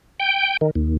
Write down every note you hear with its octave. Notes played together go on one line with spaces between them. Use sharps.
G5
D#3
D#2